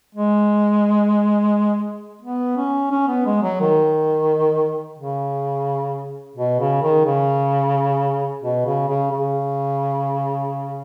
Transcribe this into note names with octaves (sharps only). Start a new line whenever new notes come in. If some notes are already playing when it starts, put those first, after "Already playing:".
G#3
B3
C#4
C#4
B3
G#3
F#3
D#3
C#3
B2
C#3
D#3
C#3
B2
C#3
C#3
C#3